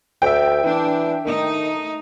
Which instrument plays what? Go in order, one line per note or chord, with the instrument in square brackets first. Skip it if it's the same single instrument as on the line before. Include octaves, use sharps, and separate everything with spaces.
[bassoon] D2 [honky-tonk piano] E5 G5
[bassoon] E3 [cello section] D4
[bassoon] D#3 [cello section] A3 D#4